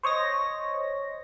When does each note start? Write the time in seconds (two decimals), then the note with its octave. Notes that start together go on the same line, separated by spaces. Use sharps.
0.03 C5 C#5 D#5 A#6